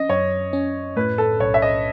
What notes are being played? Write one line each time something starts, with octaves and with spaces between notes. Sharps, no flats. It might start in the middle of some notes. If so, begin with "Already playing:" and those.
Already playing: C#4 D#5
F#2 C#5
C#4
A2 B4
A4
B1 C#5
E5
D#5